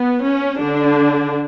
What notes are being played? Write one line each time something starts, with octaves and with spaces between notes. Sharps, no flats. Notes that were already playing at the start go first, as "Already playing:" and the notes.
Already playing: B3
C#4
D3 D4